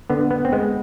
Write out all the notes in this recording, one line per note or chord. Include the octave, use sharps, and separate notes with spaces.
D3 B3
B3
C4
G#3 B3